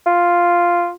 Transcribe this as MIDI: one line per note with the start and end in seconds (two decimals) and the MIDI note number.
0.06 0.91 65